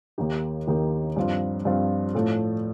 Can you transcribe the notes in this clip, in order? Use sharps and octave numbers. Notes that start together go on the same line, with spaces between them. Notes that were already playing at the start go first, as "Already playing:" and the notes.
D#2 D#3 A#3 D#4 G4
D#2 D#3 A#3 D#4 G4
G2 F3 C4 F4
G2 F3 C4 F4
A2 F3 A3